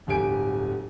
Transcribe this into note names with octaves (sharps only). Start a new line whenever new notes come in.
D1 G1 G4 G#5 D7